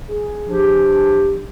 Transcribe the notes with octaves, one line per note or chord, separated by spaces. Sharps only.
G#4
F3 D4 G4